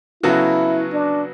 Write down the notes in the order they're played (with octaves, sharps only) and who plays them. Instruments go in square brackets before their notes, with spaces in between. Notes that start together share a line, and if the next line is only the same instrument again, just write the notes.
[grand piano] C#3 F#3 B3 F#4 A4 [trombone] E4
[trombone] D4